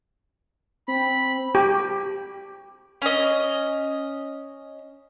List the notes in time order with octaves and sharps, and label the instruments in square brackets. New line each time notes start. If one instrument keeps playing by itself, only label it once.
[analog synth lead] C4 [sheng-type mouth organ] B5
[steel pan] G4
[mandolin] C#4 D#5